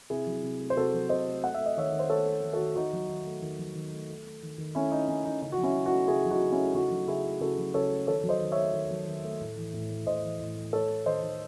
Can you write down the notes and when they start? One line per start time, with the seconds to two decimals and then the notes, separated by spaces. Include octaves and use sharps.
0.10 C3 E4 G#4
0.27 F#3
0.43 C3
0.60 A3
0.70 C5
0.76 C3 F#4 A4
0.94 F#3
1.09 C3 C5 D#5
1.26 A3
1.43 A3 F#5
1.54 E5
1.60 A3
1.66 D#5
1.77 D#3 C#5 E5
1.92 D#3
1.99 C5
2.09 A3 A4 C#5
2.26 A3
2.43 D#3
2.53 F#4 A4
2.59 D#3
2.75 D#3 D#4 F#4
2.93 F#3
3.09 D#3
3.26 A3
3.42 D#3
3.59 F#3
3.75 D#3
3.93 A3
4.09 A3
4.26 A3
4.43 D#3
4.58 D#3
4.75 A3 C#4 E4
4.92 A3 D#4
5.08 D#3 C#4
5.24 D#3 D#4
5.41 C#3 D#4
5.52 F#4
5.58 F#3
5.63 C#4 E4
5.75 C#3
5.85 D#4 F#4
5.91 A3
6.07 C#3 E4 G#4
6.25 F#3
6.31 D#4 F#4
6.41 C#3
6.52 C#4 E4
6.58 A3
6.74 C#3 D#4 F#4
6.91 F#3
7.07 C#3 E4 G#4
7.25 A3
7.40 C#3 F#4 A4
7.58 F#3
7.74 C#3 A4 C#5
7.91 A3
8.07 D#3 A4 C#5
8.23 F#3
8.29 C5 D#5
8.41 D#3
8.52 A3 C#5 E5
8.74 D#3
8.91 F#3
9.07 D#3
9.24 A3
9.41 A2
9.56 E3
9.74 A2
9.90 A3
10.07 A2 C5 D#5
10.23 E3
10.39 A2
10.56 A3
10.73 A3 A4 C#5
10.89 A3
11.06 D#3 C5 D#5
11.23 D#3